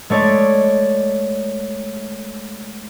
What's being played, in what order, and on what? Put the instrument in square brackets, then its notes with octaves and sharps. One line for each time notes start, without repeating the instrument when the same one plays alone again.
[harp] G#3 A3 C#5 D5